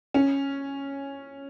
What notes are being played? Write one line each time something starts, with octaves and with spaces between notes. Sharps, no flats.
C#4